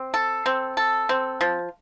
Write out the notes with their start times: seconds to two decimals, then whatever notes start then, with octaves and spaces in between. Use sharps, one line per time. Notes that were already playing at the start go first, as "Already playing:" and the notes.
Already playing: C4
0.14 A4
0.46 C4
0.77 A4
1.09 C4
1.41 F3